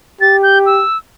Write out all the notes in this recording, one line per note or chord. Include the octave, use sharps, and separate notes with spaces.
G4 A6
G6
E6